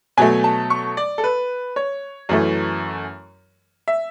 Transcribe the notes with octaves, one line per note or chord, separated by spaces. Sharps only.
B2 F#3 A3 G#5
A5
C#6
D5
A4
B4
C#5
F#2 E3 A3
E5